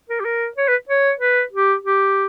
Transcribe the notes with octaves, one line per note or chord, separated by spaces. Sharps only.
A#4
G4
A#4
C#5
B4
C#5
B4
G4
G4